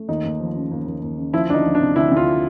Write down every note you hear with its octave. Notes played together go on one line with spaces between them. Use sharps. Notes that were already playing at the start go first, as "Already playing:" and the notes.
Already playing: A3
D#2 D#4
D#2
F3
C#3
D#2
D#2
D#2
C#3
F3 E4
D2 D4 D#4
F3
D4
C3
D2 E4
D2
F4